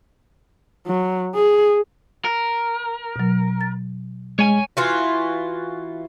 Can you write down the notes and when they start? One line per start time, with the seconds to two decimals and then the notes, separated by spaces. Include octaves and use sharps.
0.87 F#3
1.35 G#4
2.25 A#4
3.16 B2 F#3
3.61 A6
4.39 G#3 C#5 G#5
4.77 E3 F4 F#4